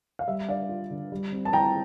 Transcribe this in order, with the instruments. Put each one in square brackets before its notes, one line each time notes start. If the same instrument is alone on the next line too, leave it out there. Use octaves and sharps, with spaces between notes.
[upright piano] F5
[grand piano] G3 [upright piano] E5
[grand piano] D4 [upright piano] D5 F5
[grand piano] F4
D3
G3
C4
[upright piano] A5
[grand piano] E4 [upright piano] G5 A#5